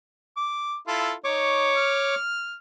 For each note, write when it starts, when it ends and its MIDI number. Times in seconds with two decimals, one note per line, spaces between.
0.37 0.76 86
0.88 1.13 64
0.88 1.13 65
0.88 1.13 69
1.24 1.74 63
1.24 2.15 73
1.24 2.15 85
1.24 2.15 86
1.77 2.56 89